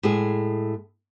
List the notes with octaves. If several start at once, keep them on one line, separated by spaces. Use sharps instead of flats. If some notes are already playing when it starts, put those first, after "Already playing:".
A2 G#3 G#4